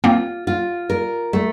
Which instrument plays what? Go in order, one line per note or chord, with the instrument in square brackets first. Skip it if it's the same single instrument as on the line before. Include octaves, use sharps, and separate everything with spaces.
[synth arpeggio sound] A#3 C4 [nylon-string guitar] F4
[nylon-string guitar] F4
A#4
A3